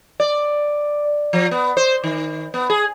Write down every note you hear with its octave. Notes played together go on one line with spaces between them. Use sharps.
D5
F3
B3
C5
D#3
B3
G#4